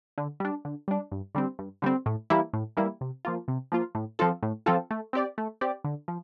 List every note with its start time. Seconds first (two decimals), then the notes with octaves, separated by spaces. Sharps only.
0.18 D3
0.40 G3 D4
0.65 D3
0.88 G3 D4
1.12 G2
1.35 D3 G3 C4
1.59 G2
1.82 D3 G3 C4
2.06 A2
2.30 E3 G3 A#3 E4
2.53 A2
2.77 E3 G3 A#3 E4
3.01 C3
3.25 F3 A#3 F4
3.48 C3
3.72 F3 A#3 F4
3.95 A2
4.19 F3 C4 F4 A4
4.43 A2
4.66 F3 C4 F4 A4
4.91 A3
5.13 C4 G4 D5
5.38 A3
5.61 C4 G4 D5
5.84 D3
6.08 F3